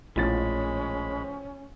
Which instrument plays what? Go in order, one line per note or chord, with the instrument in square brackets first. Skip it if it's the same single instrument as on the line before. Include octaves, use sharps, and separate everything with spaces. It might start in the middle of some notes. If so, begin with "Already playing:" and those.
[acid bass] A#1 [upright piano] A2 F3 A6 [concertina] G#3 B5 [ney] C#4